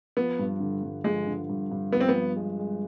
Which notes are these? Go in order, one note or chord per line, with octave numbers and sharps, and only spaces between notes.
F3 B3
G2
D3
G2
F3 G#3
D3
G2
G2
F3 B3
C4
B3
F3
G#3
G#3